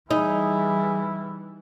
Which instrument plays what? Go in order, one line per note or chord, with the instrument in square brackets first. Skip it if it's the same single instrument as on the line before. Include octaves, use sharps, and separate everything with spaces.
[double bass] E3 G3 [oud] D#4 [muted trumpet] E4 [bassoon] G#4